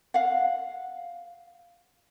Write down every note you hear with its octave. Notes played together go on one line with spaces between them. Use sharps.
F5 F#5